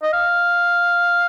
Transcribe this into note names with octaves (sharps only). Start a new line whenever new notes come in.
D#5
F5